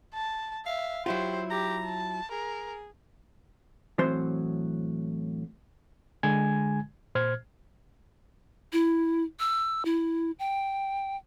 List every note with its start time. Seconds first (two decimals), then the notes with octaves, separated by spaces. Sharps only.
0.14 A5
0.66 E5 F5
1.06 F#3 E4 F4 G4 C5
1.51 G4 A#5
1.85 A5
2.32 G#4 A#4
3.98 A2 E3 F#3 C4 C5 C6
6.23 D3 G#3 G#5 G#6
7.15 A#2 C5 F6 G#6
8.73 E4
9.39 E6
9.85 E4
10.39 G5